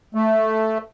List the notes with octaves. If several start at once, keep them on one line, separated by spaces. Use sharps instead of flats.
A3